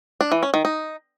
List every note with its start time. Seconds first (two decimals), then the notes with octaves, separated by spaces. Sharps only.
0.21 D4
0.32 E3
0.43 C#4
0.54 D#3
0.65 D#4